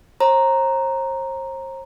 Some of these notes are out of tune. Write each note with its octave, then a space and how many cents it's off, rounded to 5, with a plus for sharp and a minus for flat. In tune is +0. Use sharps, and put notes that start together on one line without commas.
C5 +40 A#5 +0